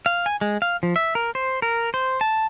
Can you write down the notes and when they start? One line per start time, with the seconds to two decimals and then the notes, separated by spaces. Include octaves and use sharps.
0.06 F5
0.26 G#5
0.41 G#3
0.62 F5
0.83 F3
0.96 E5
1.15 A#4
1.35 C5
1.62 A#4
1.94 C5
2.21 A5